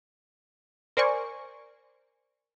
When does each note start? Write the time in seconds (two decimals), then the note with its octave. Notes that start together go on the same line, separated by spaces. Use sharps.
0.97 A#4 C5 D5 G#5 C#6